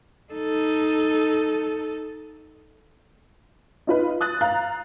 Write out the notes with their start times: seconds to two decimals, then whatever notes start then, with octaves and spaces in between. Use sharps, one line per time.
0.34 D#4 A4
3.87 D#4 F4 B4
4.21 D#6 F#6 A6
4.41 F5 A#5 F#6